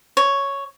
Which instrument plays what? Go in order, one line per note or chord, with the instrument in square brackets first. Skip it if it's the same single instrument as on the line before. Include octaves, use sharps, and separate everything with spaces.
[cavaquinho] C#5